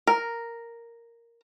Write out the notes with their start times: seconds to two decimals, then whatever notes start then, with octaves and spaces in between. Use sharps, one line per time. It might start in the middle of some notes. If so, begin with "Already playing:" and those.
0.07 A#4